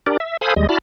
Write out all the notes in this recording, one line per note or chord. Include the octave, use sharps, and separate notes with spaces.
D4 G4 A#4 D5
E5
A4 C5 F5 G#5 B5 D#6
D#2 G3 G#3 D#5
E4 F#4 D5 A5 B5 F6